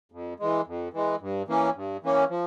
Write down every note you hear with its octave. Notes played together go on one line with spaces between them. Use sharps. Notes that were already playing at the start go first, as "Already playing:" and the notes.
F2
E3 G#3
F2
E3 G#3
G2
E3 A#3 C#4
G2
E3 A#3 C#4
F3